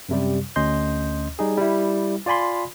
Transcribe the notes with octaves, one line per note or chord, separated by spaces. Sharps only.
F#2 C3 G3
D2 C#4 D#5 C6 G6
G3 D#4 G#4
G3 E4
F4 D5 G#5 B5 C6